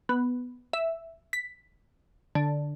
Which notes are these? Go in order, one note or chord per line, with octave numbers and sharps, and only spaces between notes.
B3
E5
B6
D3